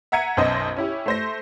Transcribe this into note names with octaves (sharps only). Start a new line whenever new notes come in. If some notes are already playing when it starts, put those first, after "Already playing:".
E5 F#5 A#5 G#6 C#7 D#7
B1 F#2 C5 D#5
C#4 E4 G4
A3 C5 A#6